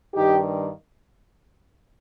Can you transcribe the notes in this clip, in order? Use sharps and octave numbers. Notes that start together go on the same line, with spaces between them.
G2 D#3 D#4 G4